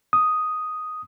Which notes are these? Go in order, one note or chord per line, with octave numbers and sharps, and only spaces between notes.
D#6